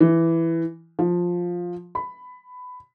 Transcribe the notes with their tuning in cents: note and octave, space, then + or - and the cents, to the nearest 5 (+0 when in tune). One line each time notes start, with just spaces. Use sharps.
E3 +5
F3 +10
B5 +15